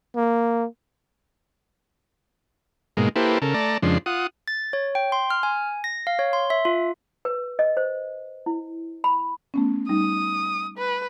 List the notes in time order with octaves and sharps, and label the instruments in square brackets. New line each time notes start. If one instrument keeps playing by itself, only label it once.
[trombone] A#3
[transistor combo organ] G#2 B2 G#3 A#3
A#3 E4 G4 A4 B4 C5
C#3 A4 A#4
A3 D5 A5 A#5
F2 C#3 F3 G#3 D4 C6
F4 F#5 D#6
[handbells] A6
C#5
G5
C6
F6
G#5
A#6
F5
C#5
C6
E5
F4
[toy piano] B4
D#5
C5
E4
B5
[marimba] A3 B3 C#4
[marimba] G3 D#4 [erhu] D#6
[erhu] B4